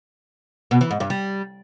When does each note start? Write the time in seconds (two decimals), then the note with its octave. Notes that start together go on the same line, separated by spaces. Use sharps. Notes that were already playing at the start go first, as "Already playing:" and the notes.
0.71 B2
0.81 E3
0.91 G#2
1.00 G2
1.10 G3